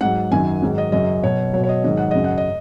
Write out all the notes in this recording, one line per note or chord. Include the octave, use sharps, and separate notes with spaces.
G#2 F#3 F#5
F#2 D#3 F#3 G#5
G#2 D#3 F#3
D#5
F#2 C#3 F#3 D#5
B2 F#3 C#5
B2 F#3 C#5
C#5
D#5
G#2 D#3 F#3 D#5
F#5
F#2 C#3 F#3 D#5
F#5
D#5